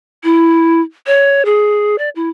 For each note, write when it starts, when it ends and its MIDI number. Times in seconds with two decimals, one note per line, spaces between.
0.24 0.81 64
1.07 1.45 73
1.45 1.96 68
1.98 2.09 74
2.16 2.29 64